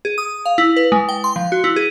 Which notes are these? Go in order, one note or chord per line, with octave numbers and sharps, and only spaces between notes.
G#4
D#6
F5
E4
B4
G#3
G5
C6
F3
F#4
E4
G#4